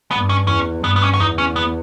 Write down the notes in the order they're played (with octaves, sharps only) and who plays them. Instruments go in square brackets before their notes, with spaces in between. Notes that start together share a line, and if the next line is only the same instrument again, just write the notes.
[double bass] G2 [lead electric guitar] B3
[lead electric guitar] C#4
[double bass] E2 [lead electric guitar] C#4
[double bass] G2 [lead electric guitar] B3
[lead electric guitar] B3
C#4
C#4
[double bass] E2 [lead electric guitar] D#4
[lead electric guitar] C#4
B3